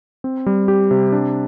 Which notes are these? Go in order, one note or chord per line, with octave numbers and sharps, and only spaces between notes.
C4
G3
G4
C3
D4